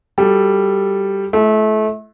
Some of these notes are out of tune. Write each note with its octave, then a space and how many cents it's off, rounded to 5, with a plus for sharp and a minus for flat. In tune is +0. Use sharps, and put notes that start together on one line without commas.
G3 +0 F#4 +0 A4 +0
A3 -30 E4 +30